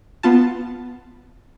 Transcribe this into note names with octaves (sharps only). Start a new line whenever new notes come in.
B3 F4 A5